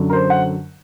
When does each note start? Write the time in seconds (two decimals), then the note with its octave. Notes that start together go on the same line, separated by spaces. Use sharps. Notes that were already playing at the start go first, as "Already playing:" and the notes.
Already playing: F#2 D3 F#3
0.10 A#4
0.13 C5
0.30 F#5